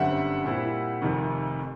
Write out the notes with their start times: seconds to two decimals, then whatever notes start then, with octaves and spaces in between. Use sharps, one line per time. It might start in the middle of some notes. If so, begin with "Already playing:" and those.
Already playing: G1 F#2 D3 G3 C4 E5 F#5
0.44 A#2 G3 C4 E4
1.01 F1 F2 C3 D#3